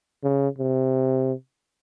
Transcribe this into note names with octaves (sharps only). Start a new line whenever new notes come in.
C#3
C3